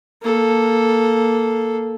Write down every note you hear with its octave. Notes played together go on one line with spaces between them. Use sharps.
A#3 A4